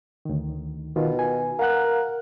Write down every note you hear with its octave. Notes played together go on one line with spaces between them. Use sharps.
D2 D#3
B2 D#3 F4
G#5
A#4 F5 F#5 F#6